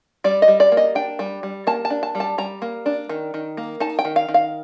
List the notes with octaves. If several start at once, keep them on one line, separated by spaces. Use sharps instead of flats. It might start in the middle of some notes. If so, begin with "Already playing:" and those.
G3 D5
D#5
G3
D5
A#3
D#5
D4 G5
G3
G3
A#3 A5
A5
D4
A5
G3
A5
G3 A#5
A#3
D4
D#3
D#3
A#3
D#4 A5
G5
D#3
F5
D#3
F5